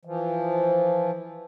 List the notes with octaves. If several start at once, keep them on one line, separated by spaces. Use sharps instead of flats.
E3 F3